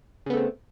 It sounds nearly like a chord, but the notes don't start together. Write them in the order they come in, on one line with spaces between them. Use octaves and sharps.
C#3 B3 A3 C4